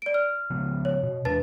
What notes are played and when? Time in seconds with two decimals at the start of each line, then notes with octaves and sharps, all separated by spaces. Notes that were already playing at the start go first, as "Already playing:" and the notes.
0.02 D5 D7
0.14 F6
0.50 C#3 F3 B3
0.85 C#5
1.03 B2
1.25 E2 D4 B4 A5 A6